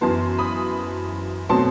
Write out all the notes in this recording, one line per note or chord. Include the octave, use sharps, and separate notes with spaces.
F#2 E3 B3 A5 C6
B5 D#6
B2 F#3 A3 C4 A5 C6